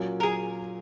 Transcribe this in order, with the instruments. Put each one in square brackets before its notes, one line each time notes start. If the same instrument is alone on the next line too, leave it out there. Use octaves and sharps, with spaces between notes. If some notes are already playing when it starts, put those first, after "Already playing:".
Already playing: [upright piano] A#2 F#3 C#4
[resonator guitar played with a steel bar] A#4
G#4